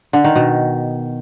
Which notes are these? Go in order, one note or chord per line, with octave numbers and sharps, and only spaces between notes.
D3
D#3
B2